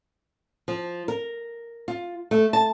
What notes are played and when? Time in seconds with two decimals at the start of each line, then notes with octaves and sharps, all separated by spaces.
0.68 F3
1.08 A#4
1.88 F4
2.31 A3
2.53 A5